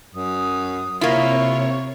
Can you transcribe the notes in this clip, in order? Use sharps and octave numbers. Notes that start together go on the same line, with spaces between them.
F#2 D#6
C3 A#3 E4 F4 C#5 C#6